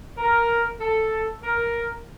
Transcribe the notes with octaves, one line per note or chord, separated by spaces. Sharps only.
A#4
A4
A#4